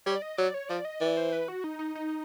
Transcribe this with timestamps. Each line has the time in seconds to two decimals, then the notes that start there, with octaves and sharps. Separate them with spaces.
0.06 G3 C#5
0.16 D5
0.22 D#5
0.37 F#3 D5
0.54 C#5
0.69 F3 D5
0.85 D#5
1.01 E3 D5
1.17 C5
1.32 B4
1.48 F#4
1.64 D#4
1.79 D#4
1.95 D#4